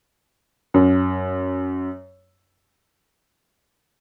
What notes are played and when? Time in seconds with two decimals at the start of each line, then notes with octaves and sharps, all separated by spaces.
0.74 F#2